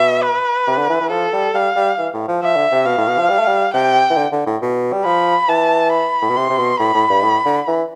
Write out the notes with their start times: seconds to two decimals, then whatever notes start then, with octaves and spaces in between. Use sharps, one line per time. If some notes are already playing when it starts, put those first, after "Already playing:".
Already playing: B2 E5
0.23 B4
0.67 C3
0.78 D3
0.90 E3
1.01 E3
1.11 F3 A4
1.33 G3
1.54 G3 F5
1.76 G3
1.99 E3
2.14 A2
2.28 F3
2.43 F3 E5
2.56 D3
2.72 C3
2.86 B2 F5
2.98 A2
3.07 B2
3.18 F3
3.30 G3
3.39 A3
3.48 G3
3.74 C3 G5
4.10 E3
4.17 D3
4.32 D3
4.46 A2
4.62 B2
4.93 G3
5.05 F3 B5
5.49 E3 A5
5.92 B5
6.22 A2
6.29 B2
6.37 C3 C6
6.50 C3
6.58 B2
6.79 A2 B5
6.94 A2
7.10 G2
7.23 A2
7.46 D3
7.68 E3